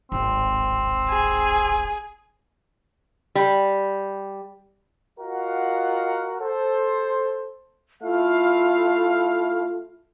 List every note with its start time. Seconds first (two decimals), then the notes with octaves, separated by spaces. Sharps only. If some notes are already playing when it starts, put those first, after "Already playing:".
0.12 D1 G#1 C4
1.09 G#4
3.35 G3
5.20 F4 F#4 A#4 D#5 F5 F#5
6.41 A4 C5
8.03 A3 E4 F4 F5